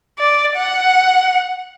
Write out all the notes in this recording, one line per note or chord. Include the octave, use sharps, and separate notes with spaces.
D5
F#5